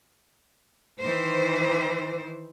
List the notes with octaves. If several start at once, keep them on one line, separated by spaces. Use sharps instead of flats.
D#3 E3 C5